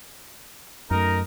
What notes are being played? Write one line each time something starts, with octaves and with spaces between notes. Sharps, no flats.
F#2 A3 D#4 A#4